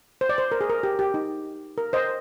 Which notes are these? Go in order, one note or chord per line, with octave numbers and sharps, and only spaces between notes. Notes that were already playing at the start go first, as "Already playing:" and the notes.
C5
D5
C5
A#4
G#4
A#4
G4
G4
D#4
A#4
C5 D#5